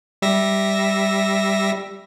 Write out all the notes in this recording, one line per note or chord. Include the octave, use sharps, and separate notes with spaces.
G3 E5 A#6